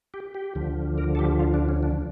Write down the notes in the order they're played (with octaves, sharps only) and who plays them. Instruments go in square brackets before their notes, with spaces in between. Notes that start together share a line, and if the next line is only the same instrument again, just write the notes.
[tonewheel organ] G4
G4
D2 D3 F3
A#4
A4
G4
F4
D4
C#4
D4